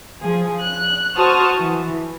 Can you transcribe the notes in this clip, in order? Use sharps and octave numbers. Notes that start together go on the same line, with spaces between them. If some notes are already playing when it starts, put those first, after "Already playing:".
F3 G#4
F#6
F#4 C5 A5 C#6 D#6 F6
E3